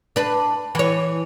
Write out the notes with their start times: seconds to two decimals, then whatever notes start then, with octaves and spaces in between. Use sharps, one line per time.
0.16 D4 B4
0.75 E3 C#5